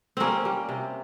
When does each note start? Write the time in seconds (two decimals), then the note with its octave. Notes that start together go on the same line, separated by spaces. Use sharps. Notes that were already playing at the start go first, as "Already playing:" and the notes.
0.17 G3 A#3 C4 C#4
0.45 G3
0.69 C3